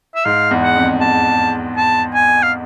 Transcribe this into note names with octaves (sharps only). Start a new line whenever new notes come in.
E5
G#2 F5
E2
F#5
F2
E2 A5
A5
G#5
F5